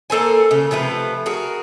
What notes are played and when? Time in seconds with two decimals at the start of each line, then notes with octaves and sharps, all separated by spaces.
0.10 A#3 A4 C5 G#5
0.51 C#3
0.71 C3 F3 A3 B4
1.26 F#4 G#4 A#4